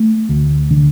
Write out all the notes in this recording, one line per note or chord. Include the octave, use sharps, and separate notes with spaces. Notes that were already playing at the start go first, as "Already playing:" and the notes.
Already playing: A3
D2
D3